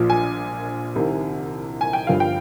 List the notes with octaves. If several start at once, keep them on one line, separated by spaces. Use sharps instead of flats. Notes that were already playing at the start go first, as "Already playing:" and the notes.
Already playing: A#1 A#2 F3
G#5
C2 C3 D#3
G#5
G5
G1 G2 F3 F5
G5